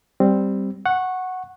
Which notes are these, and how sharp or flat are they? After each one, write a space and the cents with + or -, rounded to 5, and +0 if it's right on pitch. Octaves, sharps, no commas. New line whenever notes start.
G3 +0 C4 +0
F#5 +0 C#6 -15